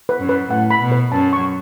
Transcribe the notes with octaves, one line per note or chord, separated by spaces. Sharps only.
B4
F#2
B4
A2 F#5
B5
B2
B4
F#2 A5
C#6